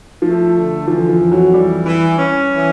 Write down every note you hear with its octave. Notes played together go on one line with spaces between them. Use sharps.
F3 A3
D3
E3 F3
F3
F2
F#3
E3 G3
E3
C#4
E3